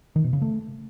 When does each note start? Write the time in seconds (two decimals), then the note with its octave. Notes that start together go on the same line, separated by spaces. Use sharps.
0.16 D#3
0.24 B2
0.33 C#3
0.42 A3